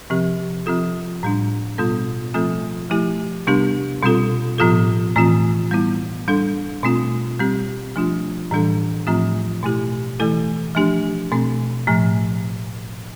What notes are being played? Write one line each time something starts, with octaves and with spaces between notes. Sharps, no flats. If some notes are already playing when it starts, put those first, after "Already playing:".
C3 F3 C4 G4
F3 C4 F4 A4
A2 G3 D4
B2 G3 B3 F4 A4
F3 A3 C4 F4 A4
F3 A3 E4 G4
C3 G3 B3 D4 G4
B2 G3 C4 F4 A4
A2 F3 B3 F4 A4
A2 E3 A3 C4 F4
G3 B3 E4
G3 D4 A4
B2 A3 C4 F4
G3 C4 G4
F3 A3 D4 F4
A2 E3 G3 D4 A4
A2 F3 A3 C4 F4
B2 A3 E4 G4
E3 A3 E4 A4
F3 A3 D4 G4
B2 A3 C4
A2 F3 A3